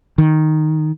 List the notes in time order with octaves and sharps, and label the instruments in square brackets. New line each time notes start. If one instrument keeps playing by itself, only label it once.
[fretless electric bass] D#3